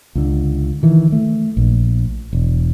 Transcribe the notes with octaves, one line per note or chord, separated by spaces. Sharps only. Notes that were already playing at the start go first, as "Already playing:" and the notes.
C#2 D3
D#3 E3
A3
A#1
E1